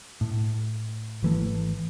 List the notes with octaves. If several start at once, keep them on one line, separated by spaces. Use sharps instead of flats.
A2
G#1 E3 A3